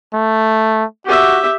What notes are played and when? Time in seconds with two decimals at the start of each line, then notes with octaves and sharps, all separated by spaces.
0.14 A3
1.06 F#4 G4 E5